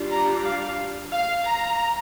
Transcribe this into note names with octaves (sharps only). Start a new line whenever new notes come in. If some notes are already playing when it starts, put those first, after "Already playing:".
Already playing: G3 D4 F4
A#5
F5
F5
A#5